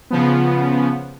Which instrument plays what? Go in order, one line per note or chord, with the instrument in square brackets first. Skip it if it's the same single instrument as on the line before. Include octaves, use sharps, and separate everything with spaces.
[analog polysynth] C#3 F3 B3